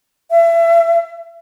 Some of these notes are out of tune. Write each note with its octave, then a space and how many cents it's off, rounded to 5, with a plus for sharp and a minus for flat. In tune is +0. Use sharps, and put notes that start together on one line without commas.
E5 +30